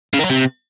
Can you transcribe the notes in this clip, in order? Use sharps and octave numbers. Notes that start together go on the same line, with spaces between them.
C#3
D#3
F#3
C3